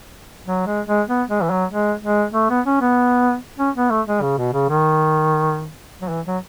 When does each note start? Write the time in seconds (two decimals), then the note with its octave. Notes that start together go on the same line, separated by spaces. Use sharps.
0.47 F#3
0.67 G#3
0.87 G#3
1.08 B3
1.30 G#3
1.43 E3
1.50 F#3
1.71 G#3
2.03 G#3
2.34 A3
2.50 B3
2.66 C#4
2.81 B3
3.59 C#4
3.76 B3
3.90 A3
4.07 G#3
4.22 C#3
4.38 B2
4.54 C#3
4.70 D#3
6.01 F#3
6.10 E3
6.27 F#3